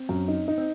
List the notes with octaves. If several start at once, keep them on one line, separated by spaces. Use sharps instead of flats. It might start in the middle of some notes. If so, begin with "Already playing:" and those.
Already playing: C4
F#2
D#4
D#4
C4